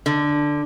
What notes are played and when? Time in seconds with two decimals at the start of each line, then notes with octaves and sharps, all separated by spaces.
0.06 D3